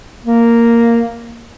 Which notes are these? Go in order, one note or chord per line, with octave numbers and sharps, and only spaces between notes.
A#3